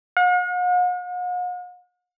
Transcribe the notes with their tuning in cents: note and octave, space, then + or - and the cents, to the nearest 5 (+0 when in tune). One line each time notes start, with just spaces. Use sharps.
F#5 -45